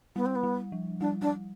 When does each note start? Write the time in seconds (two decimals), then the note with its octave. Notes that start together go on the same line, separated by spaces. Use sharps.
0.16 G3 B3
0.25 C4
0.35 B3
0.43 G3
0.72 F3
1.00 G3 D4
1.21 G3 D4